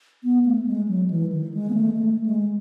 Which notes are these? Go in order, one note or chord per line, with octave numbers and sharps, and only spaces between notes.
B3
A3
G#3
F#3
E3
D#3
G#3
B3
A3
A3
G#3